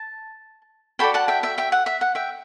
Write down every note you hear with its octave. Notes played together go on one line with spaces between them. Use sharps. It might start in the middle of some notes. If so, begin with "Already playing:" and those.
Already playing: A5
F#4 A4 D5 G5 B5
F#5 A5
E5 G5
E5 G5
E5 G5
F#5
E5
F#5
E5 G5